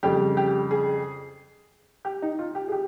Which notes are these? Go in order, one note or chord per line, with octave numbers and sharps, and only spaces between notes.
F2 C#3 G3 G4
G4
G#4
G4
D#4
F4
G4
G#4
G4